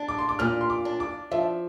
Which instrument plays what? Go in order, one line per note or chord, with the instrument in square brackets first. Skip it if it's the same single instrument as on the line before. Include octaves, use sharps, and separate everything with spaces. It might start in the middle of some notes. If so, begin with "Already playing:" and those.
Already playing: [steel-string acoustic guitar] D4
[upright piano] D6
C6
D6
[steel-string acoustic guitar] A#2 [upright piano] F6
[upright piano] C6
D6
[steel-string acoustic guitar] D4
[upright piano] D6
[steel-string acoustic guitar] F3 [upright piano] E5